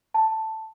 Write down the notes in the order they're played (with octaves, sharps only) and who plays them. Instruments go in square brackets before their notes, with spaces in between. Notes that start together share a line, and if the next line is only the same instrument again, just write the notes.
[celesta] A5